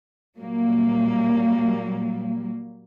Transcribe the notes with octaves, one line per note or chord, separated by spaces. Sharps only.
A#2 F#3 G3 A#3